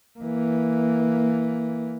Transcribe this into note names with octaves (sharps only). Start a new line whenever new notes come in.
E3 A#3